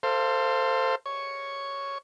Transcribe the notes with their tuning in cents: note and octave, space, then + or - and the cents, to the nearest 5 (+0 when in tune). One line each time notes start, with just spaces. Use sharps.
A4 +30 C5 +0 F5 -10
C#5 +0 C#6 +0